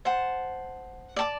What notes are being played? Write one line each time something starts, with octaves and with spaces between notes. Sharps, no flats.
C5 F#5 A5
D5 A5 D6